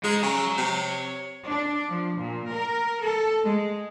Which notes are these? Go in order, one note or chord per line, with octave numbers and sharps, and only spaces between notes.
G#2 G#3 D#4
C#3 C#5 A#5
C3
D4
F3
A#2
A#4
A4
G#3